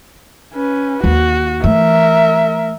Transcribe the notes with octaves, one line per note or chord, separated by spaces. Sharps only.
C#4 B4
D#2 F#4
E3 A3 A#4 E5